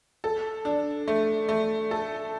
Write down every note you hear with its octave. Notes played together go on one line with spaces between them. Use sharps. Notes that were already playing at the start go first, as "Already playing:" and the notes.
A4
D4
A3
A3
A4